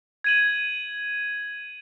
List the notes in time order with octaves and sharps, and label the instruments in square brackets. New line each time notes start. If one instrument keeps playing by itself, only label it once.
[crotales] G#6 D#7 F#7